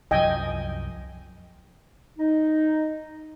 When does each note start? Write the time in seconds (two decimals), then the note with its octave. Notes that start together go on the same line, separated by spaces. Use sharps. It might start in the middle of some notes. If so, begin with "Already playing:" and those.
0.11 C2 F#2 F3 D#5 G5 G#5
2.18 D#4